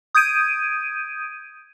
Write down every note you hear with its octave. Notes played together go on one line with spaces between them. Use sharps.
D#6 G6 G#6 D7 D#7